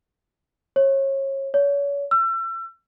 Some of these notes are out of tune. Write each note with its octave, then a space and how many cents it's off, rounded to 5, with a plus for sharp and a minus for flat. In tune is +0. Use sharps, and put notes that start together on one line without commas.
C#5 -30
C#5 +35
E6 +35